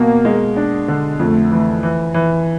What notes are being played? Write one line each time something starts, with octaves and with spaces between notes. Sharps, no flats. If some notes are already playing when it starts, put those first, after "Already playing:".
Already playing: B2 A#3
G#3
D4
D3
F2 A3
E3
E3
E3